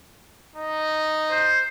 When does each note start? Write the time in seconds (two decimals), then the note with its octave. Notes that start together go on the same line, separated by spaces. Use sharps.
0.56 D#4
1.31 C5